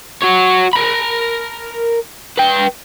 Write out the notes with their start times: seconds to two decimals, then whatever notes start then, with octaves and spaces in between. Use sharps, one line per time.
0.22 F#4 C#5
0.73 A#4 B5
2.37 B4 G5